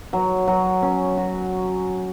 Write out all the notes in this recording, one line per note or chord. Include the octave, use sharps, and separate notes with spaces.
F#3
F#3
C#4
F#4